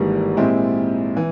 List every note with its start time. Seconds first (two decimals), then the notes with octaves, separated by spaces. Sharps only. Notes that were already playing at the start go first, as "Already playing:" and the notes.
Already playing: G#1 G#2 E3 G3 A#3
0.37 A#2 G#3 C4 E4 G4
1.17 E3